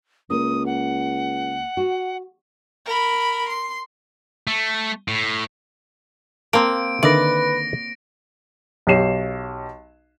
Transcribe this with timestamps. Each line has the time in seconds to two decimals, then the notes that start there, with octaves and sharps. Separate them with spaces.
0.30 C#2 A#3 D#6
0.66 F#5
1.77 F#4
2.85 A#4 B5
3.49 C6
4.47 A3
5.08 A2
6.53 A#3 C4 A#4 A5 D7
7.03 D3 D#3 B4 D5 E5 A#6 D7
8.87 B1 G4 C#5 C7 E7